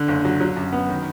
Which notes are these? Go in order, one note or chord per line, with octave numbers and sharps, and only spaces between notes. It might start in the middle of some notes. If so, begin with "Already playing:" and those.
Already playing: D3
F#1
F#3
F#3
F#2
B3
D#3